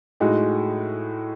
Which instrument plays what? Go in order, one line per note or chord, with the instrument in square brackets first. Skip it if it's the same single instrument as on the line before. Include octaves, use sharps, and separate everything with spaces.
[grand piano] A2 G#3 D#4 F#4